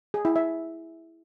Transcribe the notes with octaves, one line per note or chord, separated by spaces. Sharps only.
G#4
E4
E5